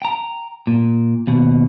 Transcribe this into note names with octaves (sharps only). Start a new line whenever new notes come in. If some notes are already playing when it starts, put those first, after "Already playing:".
G5 A#5
A#2
D#2 B2